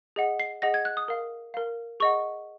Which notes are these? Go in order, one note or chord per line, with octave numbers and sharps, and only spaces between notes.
G#4 D#5 F#5
C7
G#4 D#5 F#5 A#6
G#6
F#6
D#6
A#4 F5
A#4 F5
G#4 D#5 F#5 C#6